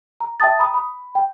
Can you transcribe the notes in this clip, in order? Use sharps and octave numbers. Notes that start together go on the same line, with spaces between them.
A#5
E5 G5 A5 D#6 A6
A#5 B5 D#6
B5
G5